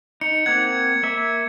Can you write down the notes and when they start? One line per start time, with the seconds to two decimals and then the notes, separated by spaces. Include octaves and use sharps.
0.21 D#4 C#7
0.46 A#3 C4 F#5 G#6 C#7
1.03 A#3 E5